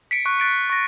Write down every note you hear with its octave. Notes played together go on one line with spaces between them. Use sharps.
B6 C#7 D7
C#6 F#6
F#6 A6 D7
C#6 A#6